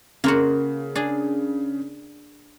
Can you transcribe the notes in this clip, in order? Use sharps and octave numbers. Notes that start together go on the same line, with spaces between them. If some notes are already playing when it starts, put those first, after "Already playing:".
C#3 A#3 F4 F#4
D4 G#4